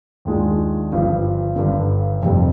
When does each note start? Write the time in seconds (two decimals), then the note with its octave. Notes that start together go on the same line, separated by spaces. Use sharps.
0.25 D#2 D#3 G#3 D4 F4
0.91 G1 G2 F3
1.56 G1 G2 D3
2.22 F1 F2 C3 G3